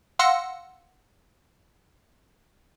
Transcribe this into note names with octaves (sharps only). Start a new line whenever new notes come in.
F5 F#5 C6 E6 A#6 C#7